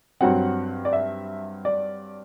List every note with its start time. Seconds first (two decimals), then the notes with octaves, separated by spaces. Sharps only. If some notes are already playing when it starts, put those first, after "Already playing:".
0.21 G2 F#3 C4 F#5
0.85 D5
0.93 E5
1.65 D5